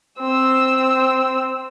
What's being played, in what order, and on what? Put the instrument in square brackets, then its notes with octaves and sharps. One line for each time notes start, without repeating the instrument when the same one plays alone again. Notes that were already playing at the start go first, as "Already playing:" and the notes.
[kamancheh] C4 E6